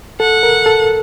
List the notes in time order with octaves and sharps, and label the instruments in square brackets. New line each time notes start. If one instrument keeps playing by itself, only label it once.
[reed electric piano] A4 [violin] F#5
[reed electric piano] A#4
A4